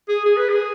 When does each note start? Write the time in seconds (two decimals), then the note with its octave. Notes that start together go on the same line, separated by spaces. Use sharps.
0.09 G#4
0.25 G#4
0.37 B4
0.49 G#4